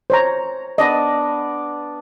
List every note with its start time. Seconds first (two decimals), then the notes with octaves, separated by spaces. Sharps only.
0.10 C5 C#5 A#5
0.78 B3 D4 D5 D#5